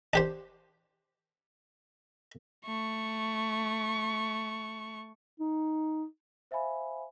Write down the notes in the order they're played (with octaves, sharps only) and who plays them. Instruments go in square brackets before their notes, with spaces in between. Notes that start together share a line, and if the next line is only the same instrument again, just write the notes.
[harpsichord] D4 G4 C5
[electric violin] A3 C#6
[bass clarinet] D#4
[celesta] C5 E5 F5 G#5 B5